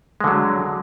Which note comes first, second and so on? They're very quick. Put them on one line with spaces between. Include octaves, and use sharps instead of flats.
G#3 D3 F#3